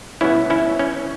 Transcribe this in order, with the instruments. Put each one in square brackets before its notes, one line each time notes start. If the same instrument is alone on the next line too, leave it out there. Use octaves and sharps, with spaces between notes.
[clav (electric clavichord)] B2 G3 B3 C#4 E4
C#4 E4
C#4